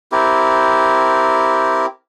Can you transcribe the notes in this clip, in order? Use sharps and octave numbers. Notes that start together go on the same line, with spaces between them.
C4 E4 G4 A#4